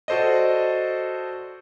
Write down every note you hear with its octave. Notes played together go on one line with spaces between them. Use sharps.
F#4 A4 C5 D5 D#5